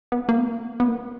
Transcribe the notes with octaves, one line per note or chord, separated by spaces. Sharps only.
B3
A#3
B3
B3
A#3